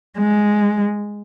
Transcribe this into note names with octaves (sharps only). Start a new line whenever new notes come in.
G#3